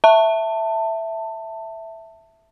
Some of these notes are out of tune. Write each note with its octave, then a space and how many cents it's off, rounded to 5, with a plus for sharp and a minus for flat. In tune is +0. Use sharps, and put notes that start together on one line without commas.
E5 +0 A5 +20